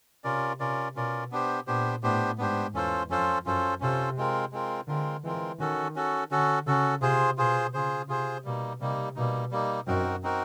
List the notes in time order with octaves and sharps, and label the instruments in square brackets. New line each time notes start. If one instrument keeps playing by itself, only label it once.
[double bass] C3 [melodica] C#4 F4 A#4 D5
[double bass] C3 [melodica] C#4 F4 A#4 D5
[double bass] B2 [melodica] C#4 F4 A#4 D5
[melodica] B3 D4 G4 C5
[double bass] A#2 [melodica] B3 D4 G4 C5
[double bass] A2 [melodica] B3 D4 G4 C5
[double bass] G#2 [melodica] B3 D4 G4 C5
[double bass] E2 [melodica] C#4 F4 A4 C5
[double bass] F2 [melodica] C#4 F4 A4 C5
[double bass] F#2 [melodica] C#4 F4 A4 C5
[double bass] C3 [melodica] C#4 F4 A4 C5
[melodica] G#3 C4 F4 A#4
G#3 C4 F4 A#4
[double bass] D3 [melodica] G#3 C4 F4 A#4
[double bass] E3 [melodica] G#3 C4 F4 A#4
[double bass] D#3 [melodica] C#4 F#4 A4
[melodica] C#4 F#4 A4
[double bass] D3 [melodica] C#4 F#4 A4
[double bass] C#3 [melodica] C#4 F#4 A4
[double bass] C3 [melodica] F4 G#4 C5
[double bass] B2 [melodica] F4 G#4 C5
[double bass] C#3 [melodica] F4 G#4 C5
[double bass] C3 [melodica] F4 G#4 C5
[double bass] B2 [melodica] G3 A#3 D#4
[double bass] C3 [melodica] G3 A#3 D#4
[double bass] B2 [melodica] G3 A#3 D#4
[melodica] G3 A#3 D#4
[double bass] F#2 [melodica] C4 D#4 F#4 A#4
[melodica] C4 D#4 F#4 A#4